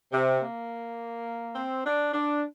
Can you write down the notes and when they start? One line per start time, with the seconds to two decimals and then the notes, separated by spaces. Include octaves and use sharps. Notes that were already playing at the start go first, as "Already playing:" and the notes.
0.12 C3
0.40 A#3
1.55 C4
1.85 D4
2.13 D4